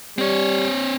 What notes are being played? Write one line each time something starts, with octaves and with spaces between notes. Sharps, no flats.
G3 C4 C#5